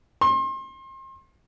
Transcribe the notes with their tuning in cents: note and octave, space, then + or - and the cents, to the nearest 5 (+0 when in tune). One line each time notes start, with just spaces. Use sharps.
C6 +35